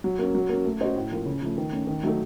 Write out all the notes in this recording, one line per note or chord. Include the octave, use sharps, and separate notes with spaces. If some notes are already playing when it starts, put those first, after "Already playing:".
F#3
A#3 C#4
F#3
A#3 C#4
A3
C#4 F#4 C5 D#5
A2
F3 A#3 F4
C#3
F3 A3
D#3
A3 C#4
D#3
F#3 A3 D#4 A4